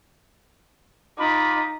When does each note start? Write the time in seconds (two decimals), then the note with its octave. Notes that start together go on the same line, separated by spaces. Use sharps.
1.18 D#4 F4 B5 D6